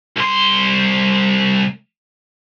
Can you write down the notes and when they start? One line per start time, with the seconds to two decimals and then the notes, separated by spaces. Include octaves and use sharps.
0.17 C2 C6